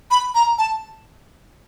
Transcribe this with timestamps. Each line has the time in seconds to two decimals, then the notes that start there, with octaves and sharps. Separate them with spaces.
0.11 B5
0.35 A#5
0.58 A5